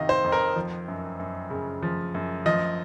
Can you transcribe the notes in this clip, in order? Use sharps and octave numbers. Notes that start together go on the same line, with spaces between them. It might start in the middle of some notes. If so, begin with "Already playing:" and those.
Already playing: F2 C3 D#3 D#5 F5
C5
F2
A#4
F3
F#2
F#2
C#3
F3
F#2
F3 D#5